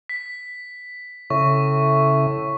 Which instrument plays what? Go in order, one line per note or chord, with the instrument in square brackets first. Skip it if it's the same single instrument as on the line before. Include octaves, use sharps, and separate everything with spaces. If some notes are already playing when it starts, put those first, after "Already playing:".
[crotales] B6
[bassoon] A2 [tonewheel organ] C#3 E5 [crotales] C#6